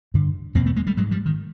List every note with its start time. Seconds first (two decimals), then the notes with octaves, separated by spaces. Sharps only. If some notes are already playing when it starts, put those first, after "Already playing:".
0.14 G2 D3
0.55 E2 B2 A#3 C4
0.66 A3 B3
0.76 G#3 A#3
0.87 G3 A3
0.97 G#2 F#3 G#3
1.11 F3 G3
1.26 D#3